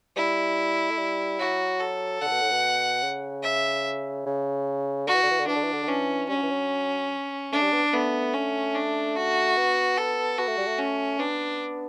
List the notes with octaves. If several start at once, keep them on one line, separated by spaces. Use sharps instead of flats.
G3 E4
A3
G3
F#3 F#4
A4
D3 F#5
A2
B2
A2
B2
C#3
E5
C#3
D3 F#4
E3
D3
E3
D3
E3 D4
D3
E3
D3
D3
E3 C#4
G3 C#4
F#3
E3
F#3
A3 D4
G3
B3
A3 B3
C#4
D4
F#4
B3
A4
B3 F#4
A3
G3
A3
C#4
B3 D4